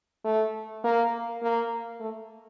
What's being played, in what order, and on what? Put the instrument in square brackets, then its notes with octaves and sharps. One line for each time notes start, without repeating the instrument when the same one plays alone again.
[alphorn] A3
A#3
A#3
A3